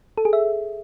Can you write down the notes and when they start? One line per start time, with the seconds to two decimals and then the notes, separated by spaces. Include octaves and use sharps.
0.18 A4
0.25 G#4
0.33 E5